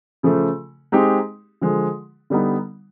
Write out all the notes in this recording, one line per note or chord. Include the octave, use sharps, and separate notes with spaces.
C#3 F3 A3
G#3 C4 D#4 G4
D3 F3 G#3
D3 G3 B3 D#4